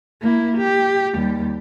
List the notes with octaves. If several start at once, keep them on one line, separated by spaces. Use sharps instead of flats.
A#3 E4
G4
D#2 G3